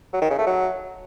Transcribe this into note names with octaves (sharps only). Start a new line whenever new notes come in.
F#3
D#3
C#3
A3
F#3